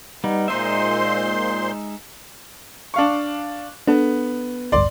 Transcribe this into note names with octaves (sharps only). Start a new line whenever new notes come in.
G3 B3 D#4
A#2 G#3 D#4 C5 E5 C6
D4 F5 C#6
B3 D4 A4
A1 D2 G2 D5 C6